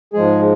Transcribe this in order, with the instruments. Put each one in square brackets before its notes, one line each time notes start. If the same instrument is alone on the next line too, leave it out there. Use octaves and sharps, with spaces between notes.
[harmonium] G#2 F3 G#3 G#4